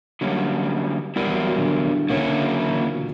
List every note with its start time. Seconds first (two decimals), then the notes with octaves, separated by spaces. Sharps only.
0.21 D3 F#3 G3 A#3 C#4
1.16 G3 B3 E4 A#4 D5
1.27 E3
1.31 F#3
1.47 F#3
1.58 D3
1.63 E3
1.86 D3
2.09 C#3 A#3 C#4 E4 A#4 C#5
2.26 D3
2.41 F#3
2.58 E3
2.69 D3
2.81 A#2
2.93 B2